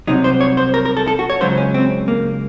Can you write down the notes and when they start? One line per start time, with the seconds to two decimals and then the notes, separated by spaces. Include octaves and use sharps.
0.07 C2 C3 F#3 D#4
0.24 C5
0.41 C#5
0.57 C5
0.74 A#4
0.85 A#4
0.97 A4
1.08 A4
1.19 F#4
1.30 C#5
1.41 C#2 C#3 F#3 C5
1.58 C#4
1.74 C4
2.08 A#3